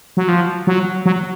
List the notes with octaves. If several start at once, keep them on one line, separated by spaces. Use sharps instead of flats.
F#3
F3
F#3
F#3